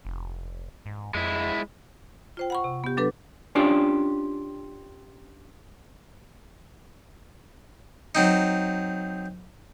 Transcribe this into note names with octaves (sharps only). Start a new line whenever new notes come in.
F1
G#2
F2 G#3 E4
F4 C5 G5
F#5 B5 C#6
C3
B3 G4
F#3 D4 A4 B4
C#4 D4 F4 G4 C#5 D5
F#3 C4 D#4